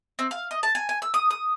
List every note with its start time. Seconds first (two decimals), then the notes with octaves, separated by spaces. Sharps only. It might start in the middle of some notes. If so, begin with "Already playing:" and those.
0.19 C4
0.31 F5
0.51 D#5
0.63 A5
0.75 G#5
0.89 G#5
1.02 E6
1.14 D#6
1.31 D#6